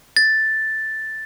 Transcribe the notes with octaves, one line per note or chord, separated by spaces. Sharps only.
A6